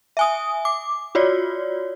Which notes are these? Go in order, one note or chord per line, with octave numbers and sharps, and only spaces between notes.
E5 G#5 D#6
D6
F4 F#4 C#5 D5